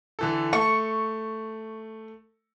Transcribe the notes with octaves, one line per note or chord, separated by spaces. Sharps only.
D3 E3 A4
A3 C#6